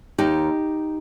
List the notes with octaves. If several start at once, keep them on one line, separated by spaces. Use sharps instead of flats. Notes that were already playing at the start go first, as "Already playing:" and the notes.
D#2 D#4 G4